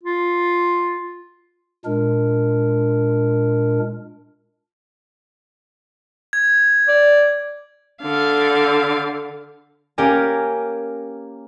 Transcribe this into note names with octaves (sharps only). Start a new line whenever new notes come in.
F4
A#2 G#3 D4 A#4
G#6
D5
D3 F5
A#3 C#4 G4 A#4 G#5